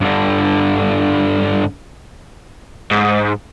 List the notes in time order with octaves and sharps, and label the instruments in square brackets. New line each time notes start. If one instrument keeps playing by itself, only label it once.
[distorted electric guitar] G2 D3
[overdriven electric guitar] G#2